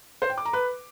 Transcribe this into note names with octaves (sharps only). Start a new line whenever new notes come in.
C5
G5
D6
A#5
B4